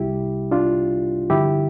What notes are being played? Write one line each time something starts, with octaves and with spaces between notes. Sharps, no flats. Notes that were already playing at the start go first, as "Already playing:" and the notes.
Already playing: C2 C3 G3 E4 G4
D4 F4
G2 D3 F3 E4 G4